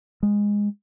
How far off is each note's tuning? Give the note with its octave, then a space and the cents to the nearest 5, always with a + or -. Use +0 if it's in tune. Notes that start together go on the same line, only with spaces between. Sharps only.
G#3 -15